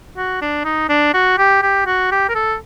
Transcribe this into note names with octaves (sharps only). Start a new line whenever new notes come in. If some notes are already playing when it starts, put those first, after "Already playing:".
F#4
D4
D#4
D4
F#4
G4
G4
F#4
G4
A#4
A4